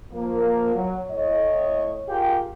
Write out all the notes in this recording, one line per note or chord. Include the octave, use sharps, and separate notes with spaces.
F3 A#3
F#3
A2 C#5 D#5
F4 G4 G#4 A#4 F5 G5